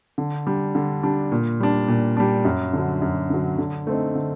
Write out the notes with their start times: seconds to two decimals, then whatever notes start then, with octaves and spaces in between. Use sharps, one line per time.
0.18 D3
0.46 G3 D4
0.75 D3
1.03 G3 D4
1.32 A#2
1.60 G3 D4
1.88 A#2
2.17 G3 D4
2.45 F#2
2.73 D3 F#3
3.02 F#2
3.30 D3 F#3
3.58 D3
3.87 A3 C4 D#4
4.15 D3